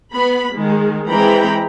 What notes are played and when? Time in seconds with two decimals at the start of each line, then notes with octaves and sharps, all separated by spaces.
0.13 B3 B5
0.53 D#3 G#3
1.09 E3 G#3 C4 G5 A#5 B5